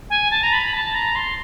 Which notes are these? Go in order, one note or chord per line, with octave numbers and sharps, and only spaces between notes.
G#5
A5
A#5
B5
A5
A#5
C6